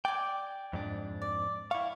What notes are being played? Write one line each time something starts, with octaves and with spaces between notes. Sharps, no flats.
D5 G5 G#5
F2 G#2 D4
D5
E4 F5 C#6